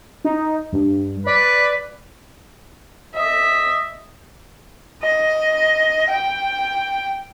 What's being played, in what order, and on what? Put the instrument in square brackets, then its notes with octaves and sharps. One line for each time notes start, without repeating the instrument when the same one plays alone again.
[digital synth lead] D#4
G2
[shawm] B4 [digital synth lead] D5
[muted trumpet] D#5 [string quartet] E5
[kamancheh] D#5
G5